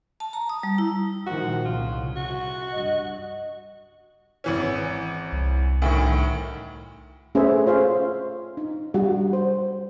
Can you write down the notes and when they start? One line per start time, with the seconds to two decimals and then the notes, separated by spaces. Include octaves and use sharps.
0.20 A5
0.33 A#5
0.49 D#6
0.63 G3
0.78 E4
1.27 A#2 D#3 F3 F#4
1.65 C2 C#3 F4
2.16 F#4
2.72 G2 D#5
4.44 G#1 E3 C#4
5.32 C2
5.82 D2 A2 D#3
7.35 A3 C#4 G#4 B4 C5 E5
7.66 F4 C5 C#5 F5
8.57 D#4
8.94 G3 F#4
9.33 C5